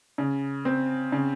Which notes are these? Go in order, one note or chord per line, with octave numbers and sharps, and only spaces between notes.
C#3
C4
C#3